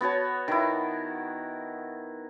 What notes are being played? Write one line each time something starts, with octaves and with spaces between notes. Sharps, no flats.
B3 F#4 C#5 A5
D#3 E4